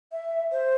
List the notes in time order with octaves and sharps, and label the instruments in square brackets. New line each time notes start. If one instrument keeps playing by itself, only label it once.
[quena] E5
C5